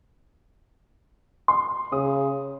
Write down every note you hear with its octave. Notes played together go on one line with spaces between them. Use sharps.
C6
C#3 D#6